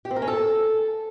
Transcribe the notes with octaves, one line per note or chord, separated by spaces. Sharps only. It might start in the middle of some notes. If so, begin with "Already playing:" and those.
G4
C4
A#4
C#4
A4